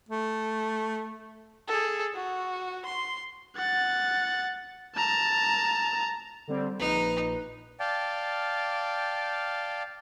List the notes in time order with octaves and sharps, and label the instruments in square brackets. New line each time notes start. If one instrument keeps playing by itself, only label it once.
[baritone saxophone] A3
[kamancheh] G#4 A4
F#4
C6
[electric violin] F#5 A6
A5 A#5
[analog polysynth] D3 G3 C4
[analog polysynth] A#1 [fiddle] D#4 [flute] B4
[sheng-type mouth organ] D5 F5 G5 A5